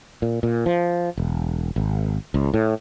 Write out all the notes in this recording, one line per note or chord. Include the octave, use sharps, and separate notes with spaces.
A#2
A#2
F3
E1
G#1
C#2
A2